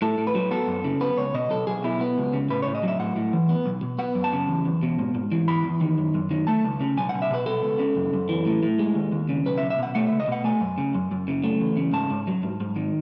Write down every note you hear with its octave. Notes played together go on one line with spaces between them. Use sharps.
A2 A4
A2
B4
F#3
B3 A4
F#2
C#3
B3 B4
C#2 C#5
B2 D#5
B1 A4
B1 G#4
B2 E4
B3
C#2
C#3
A2 B4
A2 C#5
D#5
F#3 E5
A2 F#5
A2
E3
B3
B1
B2
B3 F#5
F#2
A5
C#3
E2
E2
B2
G#2
G#2
E3
E2 B5
E2
D#3
F#2
F#2
D#3
A3 A5
C#2
C#3
B1 G#5
B1 F#5
E5
B2 B4
B3 A4
C#2
C#3
F#2
F#2
E3
A2
A2
G#3
D#2
D#2
C#3
B1 B4
E5
B1
E5
B2 F#5
A3 F#5
C#2 E5
D#5
B2 F#5
A3 G#5
F#2
C#3
F#2
F#2
C#3
A3
E2
C#3
G#2 A5
G#2
F#3
G#2
G#2
D#3